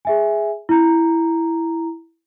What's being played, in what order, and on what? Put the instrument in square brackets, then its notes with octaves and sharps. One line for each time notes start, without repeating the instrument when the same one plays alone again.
[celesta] G#4 E5 G#5
E4 A#5